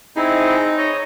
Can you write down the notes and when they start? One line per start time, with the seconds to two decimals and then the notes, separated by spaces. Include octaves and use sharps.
0.16 C4 D#4 E4 G#4
0.78 C#5 D#5